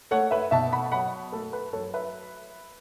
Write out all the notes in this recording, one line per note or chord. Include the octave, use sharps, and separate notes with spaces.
A3 C#5 F#5
B4 E5
B2 E5 A5
F#5 B5
F#3 F#5 B5
A3 A4
B4
F#3 A4 C#5
B4 E5